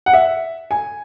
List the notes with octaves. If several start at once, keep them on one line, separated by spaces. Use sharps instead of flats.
F#5
E5
G#5